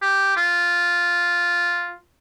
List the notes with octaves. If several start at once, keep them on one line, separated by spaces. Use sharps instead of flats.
G4
F4